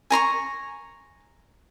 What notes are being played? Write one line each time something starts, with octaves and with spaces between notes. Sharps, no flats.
G#5 A#5 C6 C#6